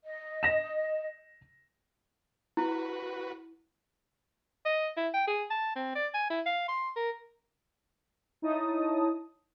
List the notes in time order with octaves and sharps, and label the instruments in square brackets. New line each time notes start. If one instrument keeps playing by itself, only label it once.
[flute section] D#5
[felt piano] A#6 E7
[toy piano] E4 [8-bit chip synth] F#4 B4
[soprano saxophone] D#5
E4
G5
G#4
A5
C4
D5
G#5
E4
F5
C6
A#4
[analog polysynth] D#4 E4 C#5 D#5 A5 D#6